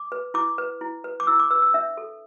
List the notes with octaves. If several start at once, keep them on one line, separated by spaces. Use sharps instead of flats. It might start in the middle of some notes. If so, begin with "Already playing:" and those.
Already playing: D6
B4
E4 D6
B4
E4
B4
D6
E4 E6
D6
B4 E6
E6
D4 E5
A4